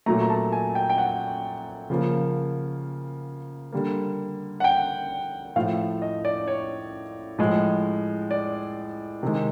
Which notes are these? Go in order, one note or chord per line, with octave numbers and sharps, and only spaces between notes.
A#2 F#3 A3 A#5
A#5
A5
G#5
G5
G5
F#5
C#3 F3 A#3
D3 G3 A#3
F#5
G5
A2 F3 A3 F5
D#5
D5
C#5
A2 F3 G#3
D5
C3 D#3 G#3